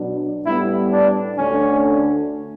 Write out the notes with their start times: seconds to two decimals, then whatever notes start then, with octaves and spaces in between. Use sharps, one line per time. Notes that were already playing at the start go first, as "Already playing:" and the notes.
Already playing: B2 F#3 B3 D4
0.45 A2 G3 B3 E4
0.92 D4
1.37 D2 D3 A3 C#4 D4